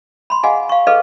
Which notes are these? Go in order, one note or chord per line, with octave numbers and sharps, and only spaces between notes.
B5 C6
G#4 D#5 F5 F#5 G#5
F5 C#6
G#4 A4 B4 D#5 F5